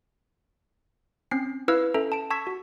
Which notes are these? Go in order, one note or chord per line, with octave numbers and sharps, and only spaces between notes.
C4 C#4 C7
E4 B4 F5 E6 F6 G#6
C#4 A4 E5 A#5
A5 D7
A5 C#6 E6 G#6 B6
F#4